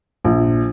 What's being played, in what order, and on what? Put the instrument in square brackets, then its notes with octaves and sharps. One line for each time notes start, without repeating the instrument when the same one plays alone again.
[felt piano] A#1